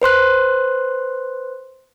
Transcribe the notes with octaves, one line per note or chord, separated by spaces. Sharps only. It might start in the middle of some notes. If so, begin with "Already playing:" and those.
B4 C5 C6 F#6